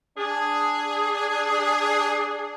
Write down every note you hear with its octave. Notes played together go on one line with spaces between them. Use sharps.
D4 G#4